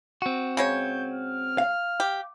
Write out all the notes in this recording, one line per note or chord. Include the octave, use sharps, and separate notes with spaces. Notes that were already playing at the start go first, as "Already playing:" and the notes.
C4 F#4
C#3 G#3 C#5 G6
F6
F5
G4